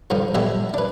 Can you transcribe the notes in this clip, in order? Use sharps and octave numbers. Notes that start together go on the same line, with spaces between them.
G2 D3 F3
E2 A2 G3 B3 E5 G#5
D4 B4